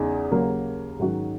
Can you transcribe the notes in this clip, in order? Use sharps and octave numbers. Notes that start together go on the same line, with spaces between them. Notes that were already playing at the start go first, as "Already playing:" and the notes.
Already playing: E2 C#3 G#3 D#4
D#2 C#3 F#3 A#3
G#2 D#3 F#3 C#4 F#4